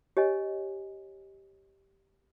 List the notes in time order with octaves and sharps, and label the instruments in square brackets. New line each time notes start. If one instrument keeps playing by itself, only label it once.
[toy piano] G4 C#5 D#5 G#5